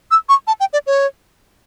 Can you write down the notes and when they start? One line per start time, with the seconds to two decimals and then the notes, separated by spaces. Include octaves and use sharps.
0.11 E6
0.29 C#6
0.47 A5
0.60 G5
0.73 D5
0.87 C#5